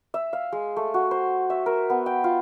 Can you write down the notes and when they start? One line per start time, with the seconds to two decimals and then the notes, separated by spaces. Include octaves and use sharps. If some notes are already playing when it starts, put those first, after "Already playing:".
0.14 E5
0.33 F5
0.52 G#3
0.77 A3
0.94 F#4
1.11 C5
1.50 E5
1.66 A#4
1.90 B3
2.06 G5
2.24 F4